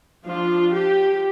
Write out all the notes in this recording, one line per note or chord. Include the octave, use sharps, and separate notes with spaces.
F3 D4 F4
G4